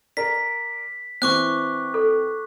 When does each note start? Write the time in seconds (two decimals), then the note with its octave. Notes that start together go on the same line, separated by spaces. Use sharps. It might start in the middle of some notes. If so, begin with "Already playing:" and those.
0.17 A#4 D5 B6
1.22 E3 C4 C#6 D6 F#6
1.94 A4